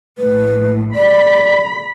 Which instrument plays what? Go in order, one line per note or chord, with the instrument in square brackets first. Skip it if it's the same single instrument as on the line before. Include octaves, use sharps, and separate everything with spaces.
[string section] A#1 A2 [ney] B4
[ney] D5 [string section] B5 B6